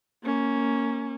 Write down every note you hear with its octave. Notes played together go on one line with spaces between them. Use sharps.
A#3 C#4